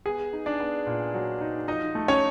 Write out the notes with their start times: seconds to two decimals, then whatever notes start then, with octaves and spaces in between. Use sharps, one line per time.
0.06 B3 G#4
0.33 D#4
0.46 D4 D5
0.60 B3
0.87 A#2
1.14 F#3
1.41 D#4
1.68 F3 D#4 D#5
1.95 A3
2.08 C#4 C#5